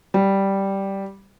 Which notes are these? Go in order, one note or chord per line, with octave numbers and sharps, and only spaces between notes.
G3